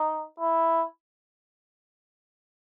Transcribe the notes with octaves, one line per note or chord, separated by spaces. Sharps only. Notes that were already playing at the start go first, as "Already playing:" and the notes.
Already playing: D#4
E4